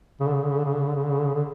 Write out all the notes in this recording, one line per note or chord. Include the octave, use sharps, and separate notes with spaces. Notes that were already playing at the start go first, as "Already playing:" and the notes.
C#3
D3
C#3
D3
C#3
D3
C#3
D3
C#3
D3
C#3
D3
C#3
D3
C#3
D3